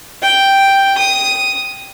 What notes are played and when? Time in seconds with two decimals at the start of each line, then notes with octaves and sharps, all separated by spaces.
0.22 G5
0.98 D#6